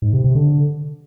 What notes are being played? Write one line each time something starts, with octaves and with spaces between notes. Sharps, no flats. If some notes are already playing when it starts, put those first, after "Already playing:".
G#2
C3
C3
D3